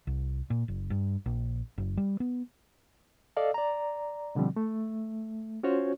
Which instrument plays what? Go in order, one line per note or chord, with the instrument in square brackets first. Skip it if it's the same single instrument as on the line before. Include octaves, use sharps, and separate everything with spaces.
[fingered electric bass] C2
A#2
F#1
G2
A#1
F#1
G3
B3
[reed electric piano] A4 D5 D#5 F5
D5 A#5
B2 D3 F3 G3 C4
A3
C#4 F4 F#4 C5 C#5